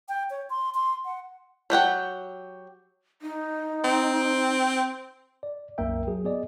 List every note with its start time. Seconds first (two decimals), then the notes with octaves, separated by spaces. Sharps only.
0.09 G5
0.30 C#5
0.50 C6
0.74 C6
1.05 F#5
1.70 F#3 G4 F#5 G5
3.22 D#4
3.84 C4
5.43 D5
5.78 C2 F#2 A#3 A#4 E5 G5
6.07 F#3 G#4
6.24 B3 G#4 D5 D#5